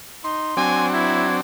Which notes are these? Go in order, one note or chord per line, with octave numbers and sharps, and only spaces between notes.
D#4 C6
F#3 C4 D4 G#5
E4 G#6